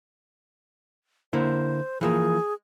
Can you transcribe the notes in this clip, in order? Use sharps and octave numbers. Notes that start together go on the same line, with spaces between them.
D3 A#3 E4 C5
E3 F3 A#3 G#4